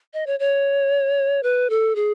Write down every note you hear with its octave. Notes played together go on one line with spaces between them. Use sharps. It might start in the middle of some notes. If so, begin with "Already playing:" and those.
D#5
C#5
C#5
B4
A4
G#4